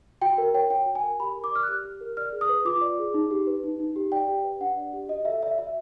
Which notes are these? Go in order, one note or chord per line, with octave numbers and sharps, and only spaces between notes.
F#4 G5
A#4
C#5 G5
F#4 G5
F#4
G#5
A#4
G4 B5
A#4
D6
D5 F6
F#6
G4 F6
G4
A#4
D5 F6
G#4
D#6
B4
F4 D6
D5
G#4
D#4
G4
B4
D#4
D#4
G4
D5 G5
G4
B4
D4 F#5
D5
G4
F#4 D#5
A4 E5
D5 E5
F#4 E5